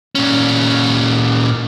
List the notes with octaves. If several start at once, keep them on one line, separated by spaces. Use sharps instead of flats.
A#2 C#4